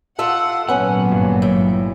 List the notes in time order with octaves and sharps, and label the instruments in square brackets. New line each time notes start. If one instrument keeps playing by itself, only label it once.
[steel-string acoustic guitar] F4 A4 E5 [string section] F#5
[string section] G#1 A#2 F#3 [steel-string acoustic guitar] B3 C#4 [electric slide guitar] F#5
[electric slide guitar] G2
[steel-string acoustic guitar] A2